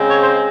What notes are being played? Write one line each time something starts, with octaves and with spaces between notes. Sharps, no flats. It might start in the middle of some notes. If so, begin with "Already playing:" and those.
Already playing: C#3 G#3 C4
C#5
C5